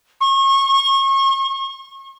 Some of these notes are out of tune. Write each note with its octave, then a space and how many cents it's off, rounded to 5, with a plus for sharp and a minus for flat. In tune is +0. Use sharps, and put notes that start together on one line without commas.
C#6 -35